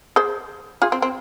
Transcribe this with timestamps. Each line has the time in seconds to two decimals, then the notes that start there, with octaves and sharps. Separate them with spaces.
0.16 G#4 C5
0.82 F4 G#4
0.92 C4
1.02 C4